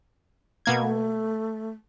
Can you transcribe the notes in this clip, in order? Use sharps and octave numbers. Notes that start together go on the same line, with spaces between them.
B2 A#3 G#6
A3